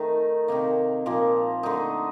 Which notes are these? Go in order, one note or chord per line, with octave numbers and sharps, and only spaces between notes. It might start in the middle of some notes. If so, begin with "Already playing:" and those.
Already playing: D#3 A3 D#4
C3 D#3 A#3
A#2 F3 A#3
D3 A3 D#4